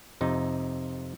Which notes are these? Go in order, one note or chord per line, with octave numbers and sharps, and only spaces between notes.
F2 C3 D#4